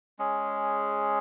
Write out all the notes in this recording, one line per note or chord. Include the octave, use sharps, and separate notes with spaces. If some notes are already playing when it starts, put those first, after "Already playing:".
G#3 C#4 G#4